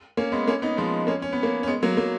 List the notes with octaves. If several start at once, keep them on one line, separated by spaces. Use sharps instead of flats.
A#3 C#4
G#3 B3
A#3 C#4
B3 D#4
F3 G#3
A#3 C#4
C#4
B3
A#3 C#4
C#4
G#3 B3
F#3 A#3
F#3 A#3